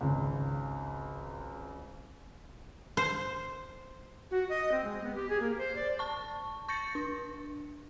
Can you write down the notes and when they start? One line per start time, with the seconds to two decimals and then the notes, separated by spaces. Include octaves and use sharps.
0.01 G#1 C#2
2.97 C5
4.31 F#4
4.49 D#5
4.72 C4
4.84 G#3
5.03 B3
5.15 G4
5.29 G#4
5.40 A#3
5.58 C5
5.75 D5
5.99 A5 C#6
6.68 C#6 G6 A6 A#6 C#7
6.95 D4